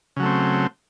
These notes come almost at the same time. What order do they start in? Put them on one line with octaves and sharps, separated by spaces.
C#3 F#3 A3 C4